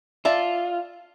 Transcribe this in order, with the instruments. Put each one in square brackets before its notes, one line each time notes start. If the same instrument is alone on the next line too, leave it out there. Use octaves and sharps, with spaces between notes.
[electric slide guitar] F4 [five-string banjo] D5 E5 A5